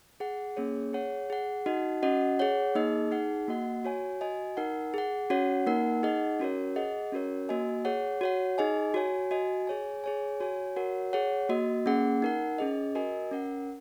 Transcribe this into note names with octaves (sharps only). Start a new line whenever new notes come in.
G#4 F#5
A#3 C#4 G#4 C#5
G#4 C#5 F#5
G#4 F#5
D#4 F#4 D#5 F#5
C#4 F#4 D#5 F#5
G#4 C#5 F#5
A#3 D#4 G#4 D#5
D#4 G#4 F#5
A#3 F#4 D#5 F#5
F#4 C#5 G#5
F#4 D#5 G#5
D#4 A#4 F#5
G#4 F#5
C#4 F#4 C#5 F#5
A#3 D#4 A#4 F#5
D#4 G#4 D#5 F#5
C#4 F#4 A#4 C#5
G#4 D#5 F#5
C#4 F#4 A#4 C#5
A#3 F#4 D#5 G#5
G#4 C#5 F#5
F#4 C#5 F#5
D#4 G#4 D#5 G#5
F#4 C#5 G#5
F#4 D#5 G#5
G#4 C#5 G#5
G#4 C#5 G#5
F#4 C#5 G#5
F#4 A#4 C#5 F#5
G#4 C#5 F#5
A#3 F#4 D#5
A#3 C#4 G#4 F#5
D#4 A#4 F#5
C#4 G#4 D#5
F#4 A#4 D#5 G#5
C#4 A#4 F#5